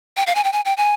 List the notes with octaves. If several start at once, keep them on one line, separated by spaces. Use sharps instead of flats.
G5
F5
G#5
G5
G#5
G5
G#5